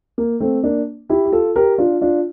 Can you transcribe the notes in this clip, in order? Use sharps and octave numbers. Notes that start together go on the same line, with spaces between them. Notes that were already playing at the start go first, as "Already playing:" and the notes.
A#3
A3 C4
A#3 D4
E4 G4
G4
F4 A4
G4 A#4
D4 F4
D4 F4